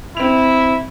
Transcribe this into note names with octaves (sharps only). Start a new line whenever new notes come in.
C4 E4 F7